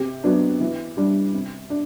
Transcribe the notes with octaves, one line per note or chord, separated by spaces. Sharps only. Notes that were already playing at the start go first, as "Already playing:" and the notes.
Already playing: C3 G4
F#3 B3 D4
E3
G3 D4
C3
D4